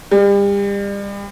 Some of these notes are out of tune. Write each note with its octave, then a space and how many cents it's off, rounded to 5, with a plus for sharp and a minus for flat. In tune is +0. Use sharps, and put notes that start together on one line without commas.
G3 +35